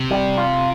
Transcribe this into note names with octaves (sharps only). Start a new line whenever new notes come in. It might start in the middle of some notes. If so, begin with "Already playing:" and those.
Already playing: C3
G3
F4